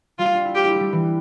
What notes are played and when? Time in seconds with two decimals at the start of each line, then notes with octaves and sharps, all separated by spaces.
0.19 G3 F4
0.34 D4
0.45 E4
0.55 F4 G4
0.68 E4
0.75 G3 A3
0.92 E3